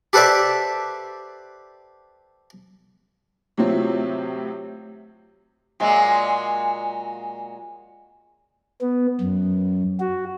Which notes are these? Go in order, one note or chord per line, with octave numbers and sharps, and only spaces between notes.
G4 A4 B4 C5 D5 E5
A2 C3 F#3 C4 E4 F4
A#2 F#3 G#3
B3
F#2
F#4